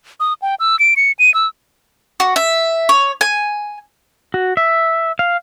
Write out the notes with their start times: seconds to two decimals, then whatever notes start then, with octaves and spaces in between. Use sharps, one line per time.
0.20 D#6
0.42 G5
0.60 E6
0.79 D7
0.96 C#7
1.19 D#7
1.34 E6
2.20 F#4
2.36 E5
2.89 C#5
3.21 G#5
4.34 F#4
4.57 E5
5.19 F5